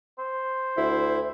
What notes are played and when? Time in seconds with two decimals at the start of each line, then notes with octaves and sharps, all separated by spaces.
0.19 C5
0.77 D2 E4